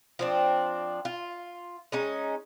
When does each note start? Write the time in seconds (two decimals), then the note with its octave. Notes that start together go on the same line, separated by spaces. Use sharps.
0.19 F3 C4 D4
1.05 F4
1.92 G#3 C#4 D#4